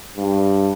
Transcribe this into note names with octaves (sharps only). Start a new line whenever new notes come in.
G2